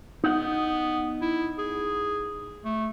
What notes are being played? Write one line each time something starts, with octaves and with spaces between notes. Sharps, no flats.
B3 D#4 F#5
E4
G#4
A3